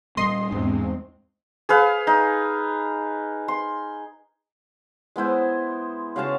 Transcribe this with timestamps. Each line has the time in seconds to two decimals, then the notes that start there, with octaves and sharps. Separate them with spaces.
0.17 A#2 G3 A#3 D#5 C6
0.51 E2 G#2 G#3 C4 D4
1.69 G#4 B4 F5
2.07 D#4
3.48 C6
5.16 G#3 B3 E4 C5
6.16 C#3 F#4 F5 A5